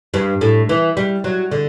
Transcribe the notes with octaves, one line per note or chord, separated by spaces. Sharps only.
G2
A2
E3
G3
F#3
D3